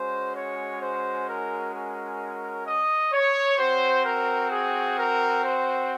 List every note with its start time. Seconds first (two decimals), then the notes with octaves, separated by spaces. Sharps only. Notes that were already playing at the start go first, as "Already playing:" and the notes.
Already playing: G#3 C#4 F#4 C5
0.35 C#5
0.81 C5
1.28 A#4
1.73 A#4
2.66 D#5
3.12 C#5
3.58 C4 F#4 C5
4.04 A#4
4.50 G#4
4.97 A#4
5.43 C5